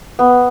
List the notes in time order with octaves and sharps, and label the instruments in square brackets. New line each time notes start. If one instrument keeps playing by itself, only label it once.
[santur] B3